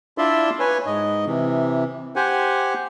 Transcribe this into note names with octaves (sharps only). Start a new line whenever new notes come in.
D4 E4 F4 D5 E5 C6
B4 C#5 G#5
G#2 D#5
C3 E3
G4 C5 F#5 G#5